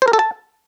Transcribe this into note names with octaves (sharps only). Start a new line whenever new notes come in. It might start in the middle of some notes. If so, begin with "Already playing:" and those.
C5
A#4
A4
A5